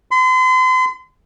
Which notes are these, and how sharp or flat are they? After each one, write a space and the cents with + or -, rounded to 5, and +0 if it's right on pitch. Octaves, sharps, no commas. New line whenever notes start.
C6 -40